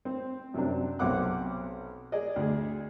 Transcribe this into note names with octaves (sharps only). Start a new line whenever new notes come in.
C4
F#2 C3 F#3 C4 D4
B1 C3 C4 F#5 D6 F#6
G#4 D5 D#5
D2 G#4